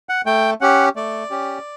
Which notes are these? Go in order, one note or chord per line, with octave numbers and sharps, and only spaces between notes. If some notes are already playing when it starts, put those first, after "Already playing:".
F#5
A3 G5
C#4 G4 F#5
A3 D5
C#4 G4